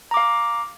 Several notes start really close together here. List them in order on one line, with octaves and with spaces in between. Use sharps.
A#5 D6 F5